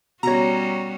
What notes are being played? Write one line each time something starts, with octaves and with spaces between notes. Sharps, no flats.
B2 G3 C#4 F#4 C#5 A#5